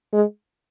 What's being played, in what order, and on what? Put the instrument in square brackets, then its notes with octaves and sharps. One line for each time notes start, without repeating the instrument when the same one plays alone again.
[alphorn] G#3